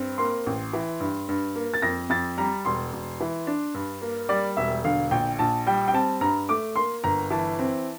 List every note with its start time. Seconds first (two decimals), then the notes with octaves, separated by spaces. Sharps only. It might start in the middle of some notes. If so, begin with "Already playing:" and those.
Already playing: G2 C4
0.18 A#3 C6
0.46 A1
0.73 E3
1.00 G2
1.29 G2
1.56 A#3
1.74 A6
1.82 F2 A#6
2.10 F2 A6
2.37 G3 A#5
2.65 E1 C6
2.93 E1
3.20 E3
3.47 D4
3.74 G2
4.02 A#3
4.29 G3 D5
4.57 E1 E5
4.85 D3 F5
5.11 A#1 G5
5.39 A#1 A5
5.66 G3 G5
5.88 G5
5.93 C4 A5
6.21 G2 A#5
6.49 A3 D6
6.76 A#3 C6
7.04 G1 A#5
7.30 E3 A5
7.59 C4